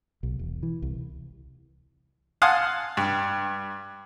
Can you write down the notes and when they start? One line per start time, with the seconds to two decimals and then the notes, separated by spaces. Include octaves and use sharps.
0.23 B1
0.39 E1
0.63 E3
0.82 C2
2.42 F5 F#5 G#5 A5 C6 D#6
2.97 G2